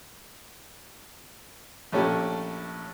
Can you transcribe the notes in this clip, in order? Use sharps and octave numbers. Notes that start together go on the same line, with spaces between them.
A#1 A3 C#4 G4